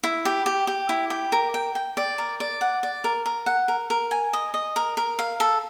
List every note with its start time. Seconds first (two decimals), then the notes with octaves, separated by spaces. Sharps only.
0.04 E4
0.25 G4
0.46 G4
0.67 G4
0.89 E4
1.10 G4
1.32 A#4
1.54 G5
1.75 G5
1.97 D5
2.18 A#4
2.40 D5
2.61 F#5
2.83 D5
3.04 A#4
3.26 A#4
3.46 F#5
3.68 A#4
3.90 A#4
4.11 G#5
4.33 D#5
4.54 D#5
4.76 A#4
4.97 A#4
5.19 F5
5.40 A4